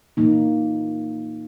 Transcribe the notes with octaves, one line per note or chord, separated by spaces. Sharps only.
A#2 E3 A#3 D#4